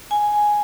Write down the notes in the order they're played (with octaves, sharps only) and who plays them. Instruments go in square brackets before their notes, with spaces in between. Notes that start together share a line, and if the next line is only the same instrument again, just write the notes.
[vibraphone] G#5